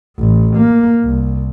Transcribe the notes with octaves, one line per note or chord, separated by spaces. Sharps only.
A1
A#3
C2